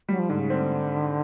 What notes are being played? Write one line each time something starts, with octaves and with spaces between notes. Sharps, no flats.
F#3 G3
F3
G#2 D3
C#3
D3 C4